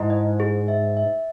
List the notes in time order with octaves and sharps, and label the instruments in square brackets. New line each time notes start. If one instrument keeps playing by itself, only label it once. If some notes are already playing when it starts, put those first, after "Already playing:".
Already playing: [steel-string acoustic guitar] G#2 [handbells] E4
[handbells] D#5
G#4
E5
E5